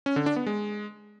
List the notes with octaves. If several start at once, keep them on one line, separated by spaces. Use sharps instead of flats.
C#4
D3
D4
B3
G#3